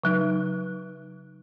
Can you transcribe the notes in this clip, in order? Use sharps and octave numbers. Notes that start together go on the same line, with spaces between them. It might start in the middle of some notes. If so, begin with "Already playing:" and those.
C#3 F#3 D#4